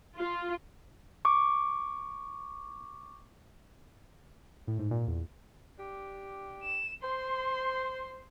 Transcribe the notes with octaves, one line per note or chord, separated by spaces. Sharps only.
F4
C#6 D6
A2
G#2
A#2
E2
D4 G4
E7
C5 C6